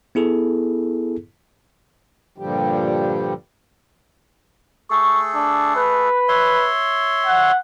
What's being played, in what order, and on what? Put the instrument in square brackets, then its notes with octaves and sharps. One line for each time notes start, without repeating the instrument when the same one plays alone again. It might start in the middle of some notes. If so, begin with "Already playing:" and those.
[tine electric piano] B3 E4 G#4 A4
[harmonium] G2 A#2 D3 F3 G3 G4
[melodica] A3 G#4 A4 [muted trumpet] C#6
[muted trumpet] D4
B4
[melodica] C#5 E5 C6
[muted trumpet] F#5